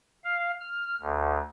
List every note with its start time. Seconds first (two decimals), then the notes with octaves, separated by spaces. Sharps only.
0.24 F5
0.61 F6
1.01 D2